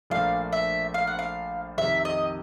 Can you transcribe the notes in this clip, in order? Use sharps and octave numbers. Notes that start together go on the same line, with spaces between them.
A#1 A#2 F3 A3 D4 F5
E5
F5
F#5
F5
F2 C3 D#3 E5
D#5